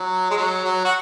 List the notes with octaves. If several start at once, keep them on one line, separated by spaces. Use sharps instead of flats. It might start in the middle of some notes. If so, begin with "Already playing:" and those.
Already playing: F#3
G#3
F#3
F#3
F#4